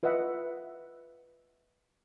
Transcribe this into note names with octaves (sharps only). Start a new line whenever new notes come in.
F4 B4 D#5 E5 F#5